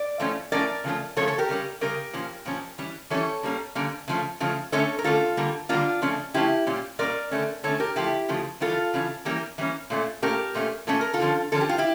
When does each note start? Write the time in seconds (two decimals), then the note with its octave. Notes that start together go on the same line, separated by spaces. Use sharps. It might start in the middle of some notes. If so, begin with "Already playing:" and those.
Already playing: D5
0.20 A2 F3 A3 C#4
0.52 A2 F3 A3 C#4 A#4 D5
0.84 C#3 F3 A3 C#4
1.17 C#3 F3 A3 C#4 A4 C#5
1.28 A4 C#5
1.38 G4 A#4
1.49 C#3 G3 C#4
1.81 C#3 G3 C#4 G4 A#4
2.13 A#2 F3 C#4
2.46 A#2 F3 C#4
2.78 E3 G3 C#4
3.10 E3 G3 C#4 A4 C#5
3.43 D3 G3 A#3 C#4
3.75 D3 G3 A#3 C#4
4.08 C#3 F3 A3 C#4
4.40 C#3 F3 A3 C#4
4.72 D3 A3 C#4 A4 C#5
4.99 A#4
5.04 D3 A3 C#4 F4 A4
5.37 D3 G3 A#3
5.69 D3 G3 A#3 D4 F4
6.02 C#3 F3 A3 C#4
6.34 C#3 F3 A3 C#4 E4 G4
6.67 A#2 G3 C#4
6.99 A#2 G3 C#4 A#4 D5
7.31 D3 A3 C#4
7.63 D3 A3 C#4 A4 C#5
7.80 G4 A#4
7.96 C#3 F3 A3 E4 G4
8.29 C#3 F3 A3
8.60 C#3 E3 G3 C#4 F4 A4
8.93 C#3 E3 G3 C#4
9.25 E3 G3 A#3 C#4 G4 A#4
9.58 E3 G3 A#3 C#4
9.90 A#2 A3 C#4
10.22 A#2 A3 C#4 G4 A#4
10.55 A#2 A3 C#4
10.87 A#2 A3 C#4 A4
11.01 A#4
11.13 F4 A4
11.20 D3 F3 C#4
11.52 D3 F3 C#4 A4
11.61 G4
11.69 F4
11.78 E4 G4